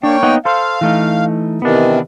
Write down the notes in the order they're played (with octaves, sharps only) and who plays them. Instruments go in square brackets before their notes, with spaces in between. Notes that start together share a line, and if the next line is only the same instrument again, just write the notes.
[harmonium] A#3 C#5 G5 [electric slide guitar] D4
[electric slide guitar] B3 D#4 F#5
[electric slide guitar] A4 C5 [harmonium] F5
[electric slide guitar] E3 A3 D#4
[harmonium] C3 D#3 E3 [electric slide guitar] B3 D4